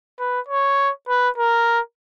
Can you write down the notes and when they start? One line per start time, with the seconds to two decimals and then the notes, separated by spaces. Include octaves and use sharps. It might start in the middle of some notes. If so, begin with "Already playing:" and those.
0.20 B4
0.48 C#5
1.09 B4
1.38 A#4